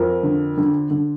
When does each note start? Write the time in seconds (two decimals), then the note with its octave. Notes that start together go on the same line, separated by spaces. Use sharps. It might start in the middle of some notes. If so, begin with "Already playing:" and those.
Already playing: F2 A#4
0.23 D3
0.57 D3
0.91 D3